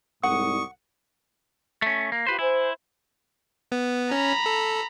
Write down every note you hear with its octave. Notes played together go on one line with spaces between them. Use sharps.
C2 G#2 F#5 C#6 D#6
A3 C#4
A#3
F4 G4 B4 C5
E4 C5 G#5
B3
C#4 A#5 B5
A4